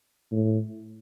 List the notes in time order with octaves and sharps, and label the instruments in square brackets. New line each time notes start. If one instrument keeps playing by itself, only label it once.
[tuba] A2